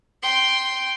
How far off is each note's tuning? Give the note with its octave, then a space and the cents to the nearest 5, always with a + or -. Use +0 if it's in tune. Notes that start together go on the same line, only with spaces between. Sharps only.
G5 +0 C6 +0